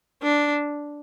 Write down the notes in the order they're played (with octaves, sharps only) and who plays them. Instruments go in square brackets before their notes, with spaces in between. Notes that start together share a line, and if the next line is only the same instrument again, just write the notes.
[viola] D4